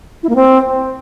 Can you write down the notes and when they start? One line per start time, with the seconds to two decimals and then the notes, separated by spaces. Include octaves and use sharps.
0.23 E4
0.29 A#3
0.36 C4